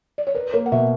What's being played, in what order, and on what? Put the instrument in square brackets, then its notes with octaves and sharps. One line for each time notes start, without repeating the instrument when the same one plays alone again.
[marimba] D5
C#5
[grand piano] A#4 [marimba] B4
[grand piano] A#3 [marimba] C#5
[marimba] F#5
[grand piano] B2 [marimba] E5